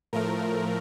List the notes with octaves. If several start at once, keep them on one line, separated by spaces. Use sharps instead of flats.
A2 F3 A3 A#4